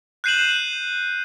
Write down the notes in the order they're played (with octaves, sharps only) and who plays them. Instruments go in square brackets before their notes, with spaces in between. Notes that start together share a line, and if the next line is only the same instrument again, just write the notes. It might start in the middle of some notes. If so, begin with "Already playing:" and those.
[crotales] F#6 G6 C7 D#7 E7 F#7